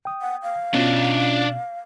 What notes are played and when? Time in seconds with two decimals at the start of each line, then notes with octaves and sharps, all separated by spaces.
0.05 G5 D#6
0.21 F#5
0.43 F5
0.74 B2 C#4 D4 F4 D#5